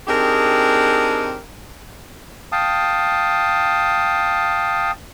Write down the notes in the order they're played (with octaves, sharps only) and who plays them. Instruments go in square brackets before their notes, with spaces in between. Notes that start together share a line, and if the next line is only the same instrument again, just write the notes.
[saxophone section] C4 D4 D#4 G4 G#4 A#4
[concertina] F5 G5 A5 D#6